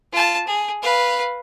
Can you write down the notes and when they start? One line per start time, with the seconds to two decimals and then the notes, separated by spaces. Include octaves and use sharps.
0.12 F4 A5
0.47 G#4
0.82 B4 F5